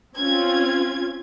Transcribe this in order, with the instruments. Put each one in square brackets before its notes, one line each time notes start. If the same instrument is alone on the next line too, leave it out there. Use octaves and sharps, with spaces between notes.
[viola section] C4 C#4 F4 [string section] G#6